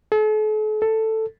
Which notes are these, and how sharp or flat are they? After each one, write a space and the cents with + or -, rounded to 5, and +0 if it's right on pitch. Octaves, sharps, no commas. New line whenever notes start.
A4 -45
A4 +5